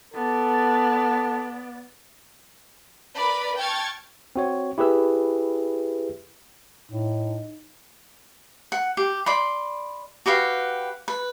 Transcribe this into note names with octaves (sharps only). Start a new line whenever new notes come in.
B3 A4 D5
A#4 B4 D5 B5
G5 A5 C#6 F6 G#6 A6
C4 F#4 C#5
E4 G4 G#4 B4 E6
A2 D#4
F#5
G4
D5 B5 C6
F#4 G4 B4 F5
B4